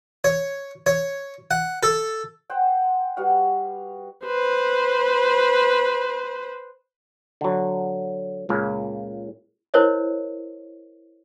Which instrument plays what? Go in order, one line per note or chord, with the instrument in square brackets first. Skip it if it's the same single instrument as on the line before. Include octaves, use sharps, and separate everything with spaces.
[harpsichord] C#5
C#5
F#5
A4
[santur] C5 F#5 G5
G3 B3 F#4 F5
[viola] B4 C5
[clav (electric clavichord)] D3 F#3
C#2 A#2 C#3
[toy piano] E4 A#4 C5 C#5 D#5